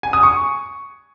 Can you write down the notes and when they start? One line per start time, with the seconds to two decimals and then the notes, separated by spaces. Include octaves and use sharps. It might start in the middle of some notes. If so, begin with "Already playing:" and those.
0.03 G#5
0.13 D#6
0.23 C#6